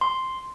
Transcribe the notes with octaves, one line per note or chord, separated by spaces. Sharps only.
C6